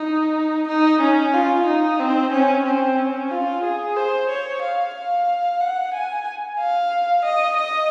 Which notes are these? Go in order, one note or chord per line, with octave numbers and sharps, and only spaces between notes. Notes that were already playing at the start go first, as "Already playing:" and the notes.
Already playing: D#4
D#4
C#4
F4
D#4
C4
C#4
C4
C#4
F4
G#4
C5
C#5
F5
F5
F#5
G#5
F5
D#5
D#5